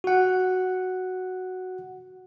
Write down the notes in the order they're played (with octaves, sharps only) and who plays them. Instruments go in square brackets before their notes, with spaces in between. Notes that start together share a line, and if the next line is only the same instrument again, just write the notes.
[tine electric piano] F#4 F#5